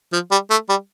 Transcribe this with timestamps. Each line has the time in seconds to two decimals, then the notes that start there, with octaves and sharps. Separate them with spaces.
0.13 F3
0.31 G3
0.50 A3
0.69 G3